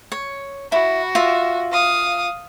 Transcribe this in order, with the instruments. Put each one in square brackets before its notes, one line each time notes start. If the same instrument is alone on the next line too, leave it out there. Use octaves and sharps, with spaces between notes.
[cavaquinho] C#5
[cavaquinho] E4 [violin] F#4
[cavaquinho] F4 E5
[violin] F5 D#6